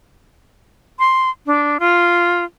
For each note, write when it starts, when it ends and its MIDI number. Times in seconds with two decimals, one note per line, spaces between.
0.99 1.30 84
1.46 1.77 62
1.80 2.44 65